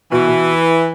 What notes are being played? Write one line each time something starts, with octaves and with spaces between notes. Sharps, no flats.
B2 E3
B2